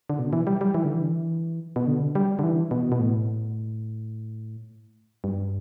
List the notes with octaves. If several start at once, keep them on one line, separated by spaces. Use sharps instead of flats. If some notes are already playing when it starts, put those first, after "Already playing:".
D3
B2
E3
G3
G3
E3
D3
E3
B2
D3
G3
D3
E3
B2
B2
A2
G2